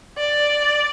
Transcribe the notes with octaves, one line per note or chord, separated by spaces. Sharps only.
D5